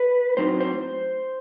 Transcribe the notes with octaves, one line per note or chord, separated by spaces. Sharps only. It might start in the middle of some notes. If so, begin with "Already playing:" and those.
Already playing: B4
A2 F#3 C4 D#4 C5
C5